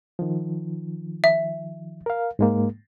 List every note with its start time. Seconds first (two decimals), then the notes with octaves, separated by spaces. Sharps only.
0.19 D#3 F3
1.24 E5
2.06 A#4 F5
2.39 G#2 G#3 A#3